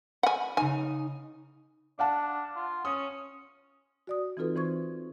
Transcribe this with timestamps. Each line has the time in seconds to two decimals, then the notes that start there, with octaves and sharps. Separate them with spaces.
0.23 F#5 G#5 B5
0.57 C#3 D#4 G#5
1.99 D4 F5 F#5 A5
2.56 F4
2.85 C#4 D#6
4.07 F#4 D5 D#6
4.37 E3 C4 D#4 F4 A4 B4
4.56 E3 C4 C5 C#6 G#6